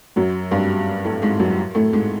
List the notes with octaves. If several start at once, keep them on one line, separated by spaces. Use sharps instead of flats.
F#2 F#3
G2 G3
A2 A3
G#2 G#3
F#2 F#3
A2 A3
G#2 G#3